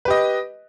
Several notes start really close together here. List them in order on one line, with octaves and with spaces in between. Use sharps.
B4 G4 D#5